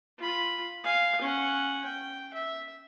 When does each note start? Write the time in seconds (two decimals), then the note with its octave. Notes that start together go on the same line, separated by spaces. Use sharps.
0.18 F4 B5
0.84 F5 G#5
1.21 C#4 F#5
1.84 G5
2.34 E5